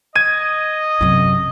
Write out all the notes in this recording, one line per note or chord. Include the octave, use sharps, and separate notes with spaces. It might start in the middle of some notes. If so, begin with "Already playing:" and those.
D#5 G#6 D#7
F#2 C3